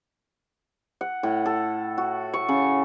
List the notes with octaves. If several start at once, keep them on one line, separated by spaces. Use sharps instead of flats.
F#5
A2
A4
F#4
C#6
C#3